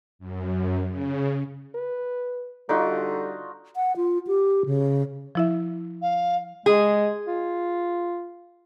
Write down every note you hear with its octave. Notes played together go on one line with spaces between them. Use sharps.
F#2
C#3
B4
D3 G3 D#4 F4 F#4 D5
F#5
F4
G4
C#3
F3 E4 E5
F5
G#3 G#4
F4